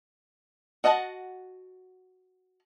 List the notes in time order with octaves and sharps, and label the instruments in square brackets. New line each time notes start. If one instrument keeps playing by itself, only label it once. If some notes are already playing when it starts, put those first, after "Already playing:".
[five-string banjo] F#4 D#5 F#5 A5